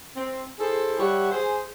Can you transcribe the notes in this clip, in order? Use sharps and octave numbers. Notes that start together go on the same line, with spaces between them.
C4
E4 G#4 A4 C5
G3 G4 C#5 E5 F#5
G#4 C5